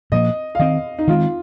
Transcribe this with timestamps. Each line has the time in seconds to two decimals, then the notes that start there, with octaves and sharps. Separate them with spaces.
0.12 A#2 F3 A#3 D#5
0.55 F5
0.59 D#3 C4 D#5
0.99 D#4
1.07 D#3 G#3 C4 F4